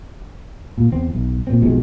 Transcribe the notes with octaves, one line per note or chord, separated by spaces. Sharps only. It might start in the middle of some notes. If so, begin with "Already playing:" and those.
A#2
E2 C4
B1
A#2 C4
B1 F2 B2 G#3